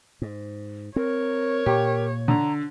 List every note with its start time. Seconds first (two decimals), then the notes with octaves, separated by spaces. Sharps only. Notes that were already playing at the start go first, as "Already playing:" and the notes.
0.22 G#2
0.96 C4 A#4 C#5
1.66 A#2 G4
2.28 D3 A#5